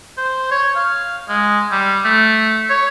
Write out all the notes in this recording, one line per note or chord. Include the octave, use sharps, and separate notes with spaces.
C5
C#5
F5
G#3
G3
A3
C#5